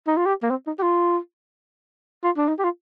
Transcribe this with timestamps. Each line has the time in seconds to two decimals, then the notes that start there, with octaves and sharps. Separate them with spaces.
0.07 D#4
0.17 F4
0.26 G4
0.43 A#3
0.50 C4
0.67 D#4
0.79 G4
0.83 F4
2.23 F4
2.37 D4
2.48 D#4
2.59 G4
2.64 F4